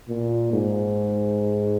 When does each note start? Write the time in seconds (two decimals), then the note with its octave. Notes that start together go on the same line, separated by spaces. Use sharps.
0.09 A#2
0.52 G#2